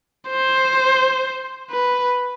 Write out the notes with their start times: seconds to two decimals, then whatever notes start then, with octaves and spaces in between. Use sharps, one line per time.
0.29 C5
1.70 B4